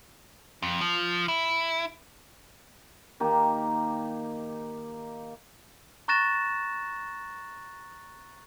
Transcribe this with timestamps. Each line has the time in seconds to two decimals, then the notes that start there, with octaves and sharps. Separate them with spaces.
0.62 F2
0.81 F3
1.28 E4
3.20 D#3 A#3 G4
6.08 A#5 C#6 F#6 A6 A#6 E7